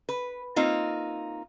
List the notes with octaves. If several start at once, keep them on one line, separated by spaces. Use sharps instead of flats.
B4
A#3 C4 D#4 F4